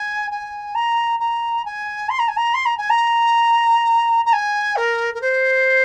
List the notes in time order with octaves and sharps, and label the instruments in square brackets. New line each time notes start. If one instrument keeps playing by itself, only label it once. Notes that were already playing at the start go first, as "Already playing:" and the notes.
Already playing: [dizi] G#5
G#5
A#5
A#5
G#5
C6
A#5
G#5
A#5
C6
A#5
G#5
A#5
A#5
G#5
A#4
A#4
C5